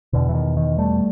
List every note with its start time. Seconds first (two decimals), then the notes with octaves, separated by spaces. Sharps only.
0.13 E2 B2 D3
0.29 E3
0.34 D#3
0.57 D#3
0.78 G3 A3